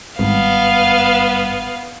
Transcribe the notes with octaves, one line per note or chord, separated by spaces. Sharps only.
G#1 G2 B3 F5